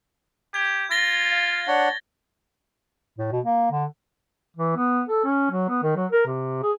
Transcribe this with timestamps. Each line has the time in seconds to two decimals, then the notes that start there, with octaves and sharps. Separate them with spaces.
0.54 G4 G#6
0.91 F4 A6 A#6 G7
1.32 F5
1.67 D4 C#5 F#5
3.19 A2
3.32 B2
3.45 A#3
3.72 D3
4.56 E3
4.77 B3
5.09 A4
5.25 C#4
5.51 F#3
5.69 B3
5.83 D#3
5.96 F#3
6.12 A#4
6.26 C3
6.63 G#4